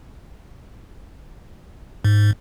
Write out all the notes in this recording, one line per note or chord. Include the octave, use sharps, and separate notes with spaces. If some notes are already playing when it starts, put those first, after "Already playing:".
G#2